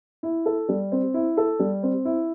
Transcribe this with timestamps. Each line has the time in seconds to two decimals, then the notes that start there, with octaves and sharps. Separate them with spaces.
0.23 E4
0.46 A4
0.69 G3
0.92 C4
1.14 E4
1.37 A4
1.59 G3
1.83 C4
2.05 E4